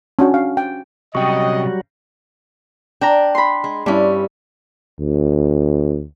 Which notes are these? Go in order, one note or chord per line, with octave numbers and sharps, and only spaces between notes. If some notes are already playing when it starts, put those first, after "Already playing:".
C#4 D4 F#4
F5
G5
C3 F#3 G3 C#4 F#4 D#5 G5 C#6
D4 G5 A#5
B5 C6
G#3
G2 G3 C#4 E4
D2